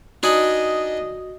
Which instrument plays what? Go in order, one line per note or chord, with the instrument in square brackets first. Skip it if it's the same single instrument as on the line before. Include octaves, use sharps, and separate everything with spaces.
[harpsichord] D4 D#4 G#5 [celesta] F#4 D#6 F#7 [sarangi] D#5